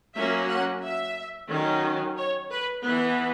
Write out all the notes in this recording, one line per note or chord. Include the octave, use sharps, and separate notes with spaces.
F#3 A#3 C#4 E5
F#5
E5
D#3 F#3 C#4
C#5
B4
E3 B3 B4